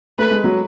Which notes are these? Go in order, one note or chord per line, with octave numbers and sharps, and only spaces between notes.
A3 B4
G#3
F#3